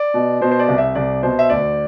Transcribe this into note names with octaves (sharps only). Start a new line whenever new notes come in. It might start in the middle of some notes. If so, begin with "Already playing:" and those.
Already playing: D5
B2
B2 C5
C5
D5
C2
E5
C2 D5
B2 C5
E5
D2 D5